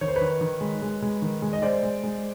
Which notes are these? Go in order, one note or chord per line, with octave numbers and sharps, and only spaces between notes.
D#3 C#5
C5
B4 C#5
D#3
D#3
G#3
G#3
G#3
D#3
G#3
D#5
G#3 C5 D5
G#3
G#3